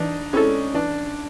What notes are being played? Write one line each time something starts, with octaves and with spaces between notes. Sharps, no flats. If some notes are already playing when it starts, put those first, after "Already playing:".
Already playing: E3 D4 D#4
G#3 C4 C#4 E4 A4
E3 D4